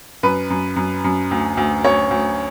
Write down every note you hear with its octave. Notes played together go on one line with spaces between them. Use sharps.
F#2 B4
F#2
F#2
F#2
D2
D2
D2 C#5
D2